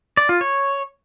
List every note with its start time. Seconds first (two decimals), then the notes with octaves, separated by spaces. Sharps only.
0.17 D5
0.29 F4
0.41 C#5